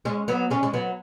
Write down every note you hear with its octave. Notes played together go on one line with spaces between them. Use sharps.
G#3 C#4
F#3 B3
G#3 C#4
G#3
F#3 B3